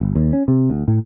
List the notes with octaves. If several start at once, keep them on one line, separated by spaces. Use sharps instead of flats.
G1
D#2
C#4
C3
D2
A2